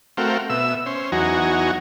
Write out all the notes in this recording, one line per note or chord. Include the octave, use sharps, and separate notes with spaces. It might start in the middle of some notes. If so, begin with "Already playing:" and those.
A3 C4 F#4 A#4 F5 G5
B2 E5 E6
C#4 C5
E2 F#3 D#4 F#4 G#5 A#5